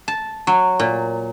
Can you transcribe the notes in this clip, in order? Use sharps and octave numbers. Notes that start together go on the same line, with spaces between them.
A5
F#3
A#2